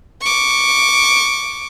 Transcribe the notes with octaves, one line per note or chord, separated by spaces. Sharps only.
C#6 D6